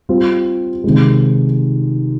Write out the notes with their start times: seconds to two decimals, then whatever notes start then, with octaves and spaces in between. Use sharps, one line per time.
0.09 G3 C4 F4
0.84 C3 D#3 G#3